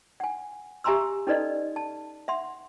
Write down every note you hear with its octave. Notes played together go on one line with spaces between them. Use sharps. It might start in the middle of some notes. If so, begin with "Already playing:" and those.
F#5 G#5
G4 E5 G#5 A#5 C6 E6
C#4 D#4 A4 B4 D5 D#5
A5
E5 F#5 C6